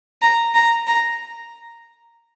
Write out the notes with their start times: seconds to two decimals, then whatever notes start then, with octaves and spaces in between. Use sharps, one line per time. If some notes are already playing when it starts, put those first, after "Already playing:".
0.22 A#5
0.55 A#5
0.87 A#5